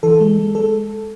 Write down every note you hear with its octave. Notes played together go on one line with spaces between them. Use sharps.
E3 A4
G#3
G#3
G#3 A4